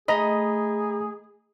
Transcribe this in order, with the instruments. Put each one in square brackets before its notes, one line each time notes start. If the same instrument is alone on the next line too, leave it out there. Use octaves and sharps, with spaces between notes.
[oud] A3 D#4 [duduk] G#4 [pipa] D#5 [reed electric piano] A#5 B5